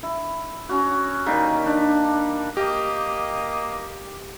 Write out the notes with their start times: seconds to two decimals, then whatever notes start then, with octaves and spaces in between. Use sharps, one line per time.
0.03 E4
0.69 C#4 F#4
1.26 D#3 G3 A#3
1.66 D4
2.57 A#3 G4 D#5